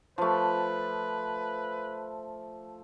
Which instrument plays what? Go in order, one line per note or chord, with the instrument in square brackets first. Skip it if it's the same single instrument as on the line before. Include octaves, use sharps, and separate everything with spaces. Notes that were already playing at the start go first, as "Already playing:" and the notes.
[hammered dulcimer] F3 A3 [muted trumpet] B4